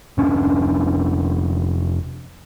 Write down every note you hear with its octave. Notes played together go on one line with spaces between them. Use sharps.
F1 C#4 D4